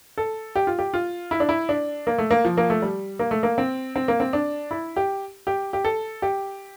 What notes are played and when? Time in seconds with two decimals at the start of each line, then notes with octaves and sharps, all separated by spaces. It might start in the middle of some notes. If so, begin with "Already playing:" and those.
0.18 A4
0.56 G4
0.67 F4
0.79 G4
0.94 F4
1.31 E4
1.40 D4
1.49 E4
1.69 D4
2.07 A#3
2.18 A3
2.31 A#3
2.45 F3
2.57 A#3
2.70 A3
2.82 G3
3.19 A#3
3.31 A3
3.43 A#3
3.58 C4
3.96 C4
4.08 A#3
4.20 C4
4.33 D4
4.71 E4
4.96 G4
5.47 G4
5.73 G4
5.85 A4
6.22 G4